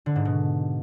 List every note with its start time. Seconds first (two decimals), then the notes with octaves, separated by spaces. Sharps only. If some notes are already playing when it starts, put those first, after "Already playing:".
0.06 D3
0.16 G#2
0.25 B2